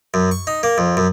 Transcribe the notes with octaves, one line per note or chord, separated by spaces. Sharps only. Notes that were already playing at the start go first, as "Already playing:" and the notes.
F#2
C#6
D#4
A#3
F2
F#2